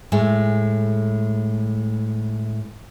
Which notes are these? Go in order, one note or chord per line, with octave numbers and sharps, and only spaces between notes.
A2 G#3 A3